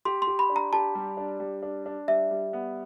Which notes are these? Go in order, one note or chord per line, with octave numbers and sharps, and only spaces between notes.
G4 C6
C6
G4
B5
D4
A#5
G4 A5
G3
D4
G3
D4
D4
G3 E5
G3
B3